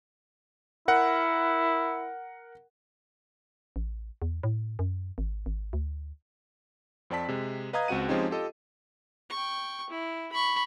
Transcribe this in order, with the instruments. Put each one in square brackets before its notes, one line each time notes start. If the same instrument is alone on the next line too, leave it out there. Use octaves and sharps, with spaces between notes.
[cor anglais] E4 [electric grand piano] A#4 F#5
[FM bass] A1
E2
A2
F#2
G#1
G#1
D2
[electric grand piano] F2 C4 D5 A5 B6
C3 G#3
B4 D#5 F5 A#5 D#6 G#6
C#2 C4 F#4 F#5 D#7
F3 G#3 C4 C#4 D#4 G4
F4 G4 A4 D#5
[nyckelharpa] G5 C#6
E4
B5 C#6